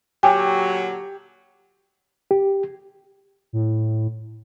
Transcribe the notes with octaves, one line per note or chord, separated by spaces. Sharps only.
A#2 D3 F#3 G4 G5 G#5
G4
A2